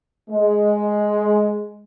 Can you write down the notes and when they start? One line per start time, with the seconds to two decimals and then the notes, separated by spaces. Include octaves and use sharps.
0.30 G#3